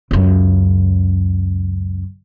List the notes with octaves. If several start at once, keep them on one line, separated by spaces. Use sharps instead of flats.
C#2 F#2